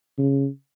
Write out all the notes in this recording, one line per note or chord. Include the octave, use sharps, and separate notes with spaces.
C#3